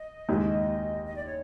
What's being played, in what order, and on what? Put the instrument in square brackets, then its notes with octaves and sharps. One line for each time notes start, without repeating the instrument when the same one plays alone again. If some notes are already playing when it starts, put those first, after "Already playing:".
Already playing: [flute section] D#5
[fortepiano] D#2 D#3 G#3
[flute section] D#5
D5
C#5